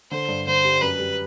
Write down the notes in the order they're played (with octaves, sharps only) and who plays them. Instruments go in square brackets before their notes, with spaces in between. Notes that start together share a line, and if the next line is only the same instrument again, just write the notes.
[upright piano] D3 [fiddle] C5
[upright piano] G2
[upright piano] D3 [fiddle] C5
[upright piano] G3
[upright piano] F#2 [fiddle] B4
[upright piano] G3